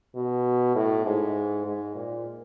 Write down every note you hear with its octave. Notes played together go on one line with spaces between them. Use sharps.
B2
A2
G#2
G#2
A#2